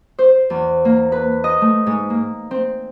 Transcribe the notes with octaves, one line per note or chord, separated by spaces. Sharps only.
C5
E2
A#3
B4
D#5
A3
G#2
A#3
C4